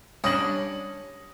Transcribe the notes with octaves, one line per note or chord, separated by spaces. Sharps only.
G3 C#4 D4 D#6 A#6 F#7